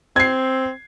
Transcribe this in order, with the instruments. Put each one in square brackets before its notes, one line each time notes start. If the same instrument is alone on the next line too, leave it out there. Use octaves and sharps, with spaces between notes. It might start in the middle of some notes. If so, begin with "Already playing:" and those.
[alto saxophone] C4 [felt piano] G#6 C7